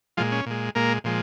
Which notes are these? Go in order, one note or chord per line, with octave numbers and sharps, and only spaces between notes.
A#2 F3 G#3 F4
C#4
A#2 G#3
A#2 G#3 A#3 A#4
A#2 F3 G#3